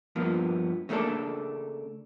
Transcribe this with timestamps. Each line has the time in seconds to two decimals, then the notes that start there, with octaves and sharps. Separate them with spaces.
0.16 G2 F3 A#3 B3
0.89 C#3 A3 A#3 D4 A4